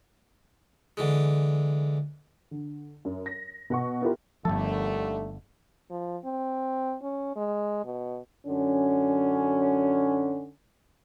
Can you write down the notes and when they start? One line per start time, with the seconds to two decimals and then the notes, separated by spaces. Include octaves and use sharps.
0.97 D3 E3 G#3
2.51 D3
3.05 F#2
3.26 A#6
3.70 B2 F#5 C#6
4.02 B3 E4 F4 G4 A#4 B4
4.45 G1 D#2 D3 F3 G3 A3 A4
5.91 F3
6.25 C4
7.03 C#4
7.36 G#3
7.85 B2
8.47 F#2 D3 C#4